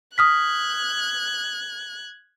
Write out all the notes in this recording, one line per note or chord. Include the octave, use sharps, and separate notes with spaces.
D#6 F6 F#6 G#6 B6